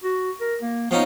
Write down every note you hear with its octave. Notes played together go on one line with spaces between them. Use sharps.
F#4
A#4
A#3
F3 B3 C#4 D#4